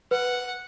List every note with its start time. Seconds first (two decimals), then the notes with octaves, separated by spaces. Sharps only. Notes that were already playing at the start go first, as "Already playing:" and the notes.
0.11 B4 F#5